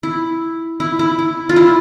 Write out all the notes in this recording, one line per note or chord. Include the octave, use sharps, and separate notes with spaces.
E4
E4
E4
E4
F4
E4